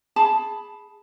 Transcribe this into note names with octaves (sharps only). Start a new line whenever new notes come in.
G#4 A5 B5